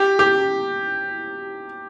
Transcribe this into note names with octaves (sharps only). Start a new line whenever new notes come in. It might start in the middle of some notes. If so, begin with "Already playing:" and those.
Already playing: G4
G4